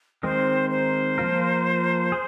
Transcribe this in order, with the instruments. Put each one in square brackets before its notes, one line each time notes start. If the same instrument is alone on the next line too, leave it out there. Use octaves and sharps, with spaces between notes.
[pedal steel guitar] D#3 G#3 C4 D#4 A#4 [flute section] C5
[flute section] C5
[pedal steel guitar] F3 A#3 F4 A#4
G#4